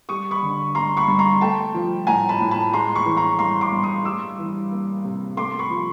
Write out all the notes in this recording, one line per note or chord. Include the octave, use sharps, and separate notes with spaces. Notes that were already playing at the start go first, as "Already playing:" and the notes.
G3 C#6 D#6
B5 C#6
D3
G2 A#5 C6
B5 C#6
G2
A#5 C6
A3 G5 A5
F3
A2 G#5 A#5
A5 B5
A2
A5 B5
G#3 A#5 C6
B5 C#6
E3
A#5 C6
G2 A#5 C6
C6 D6
G2
C#6 D#6
G3 D6 E6
E3
A#3
C3
A3 C6 D6
B5 C#6
F3